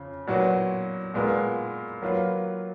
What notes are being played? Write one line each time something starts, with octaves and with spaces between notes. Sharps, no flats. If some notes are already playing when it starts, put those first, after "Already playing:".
Already playing: F2 C#3
A#2 F#3 B3 F#4
A#2 G#3 B3 F4 A#4
F#3 A#3 F4 B4